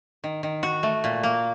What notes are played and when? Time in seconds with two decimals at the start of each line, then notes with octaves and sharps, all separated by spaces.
0.24 D#3
0.43 D#3
0.63 F#4
0.83 A3
1.04 A#2
1.23 A#3